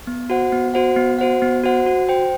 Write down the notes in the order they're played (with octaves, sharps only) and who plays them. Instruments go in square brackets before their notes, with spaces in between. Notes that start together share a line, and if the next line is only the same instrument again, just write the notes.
[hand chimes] B3
F#4 C5 F#5
B3
F#4 C5 F#5
B3
F#4 C5 F#5
B3
F#4 C5 F#5
F#4
C5 G5